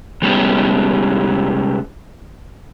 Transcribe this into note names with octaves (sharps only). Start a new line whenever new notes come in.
C3 G3 G#3 B3 C#4 G4